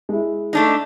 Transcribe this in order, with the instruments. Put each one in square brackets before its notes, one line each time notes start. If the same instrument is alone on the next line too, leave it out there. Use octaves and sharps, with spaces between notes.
[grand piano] G#3 E4
[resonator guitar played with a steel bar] A3 D4 D#4